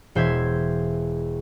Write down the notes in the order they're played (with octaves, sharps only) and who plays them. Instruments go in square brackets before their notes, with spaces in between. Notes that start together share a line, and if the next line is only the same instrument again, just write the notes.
[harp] E1 C5 E5 G#6